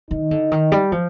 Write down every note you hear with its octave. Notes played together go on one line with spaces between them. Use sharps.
D#3 D#4
D3
D#3
G3
F3